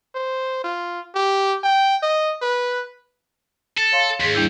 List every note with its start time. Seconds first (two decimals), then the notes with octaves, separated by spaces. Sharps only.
0.15 C5
0.64 F4
1.15 G4
1.64 G5
2.02 D#5
2.41 B4
3.78 A4 A6
3.92 C#5 F5 C6
4.20 D#2 G#2 G#4 B6
4.35 G3 D4 E4 G6